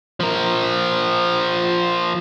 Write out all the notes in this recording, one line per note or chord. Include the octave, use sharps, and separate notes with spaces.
F3 A#4